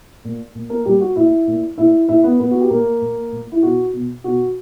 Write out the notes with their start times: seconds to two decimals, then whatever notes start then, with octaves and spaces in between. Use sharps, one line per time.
0.24 A#2
0.55 A#2
0.70 A#3 A#4
0.85 A#2 G3 G4
1.01 F#4
1.16 A#2 E4 E5
1.47 A#2
1.78 A#2 E4 E5
2.09 A#2 E4 E5
2.24 B3 B4
2.39 A#2 B3 B4
2.51 F#4
2.61 G4
2.70 A#2 A#3 A#4
3.01 A#2
3.32 A#2
3.52 E4
3.63 B2 F#4
3.93 B2
4.24 B2 F#4